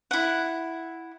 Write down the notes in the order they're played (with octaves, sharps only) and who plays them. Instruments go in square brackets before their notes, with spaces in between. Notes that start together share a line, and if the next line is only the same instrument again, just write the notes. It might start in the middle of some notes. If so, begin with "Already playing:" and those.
[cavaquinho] E4 F#5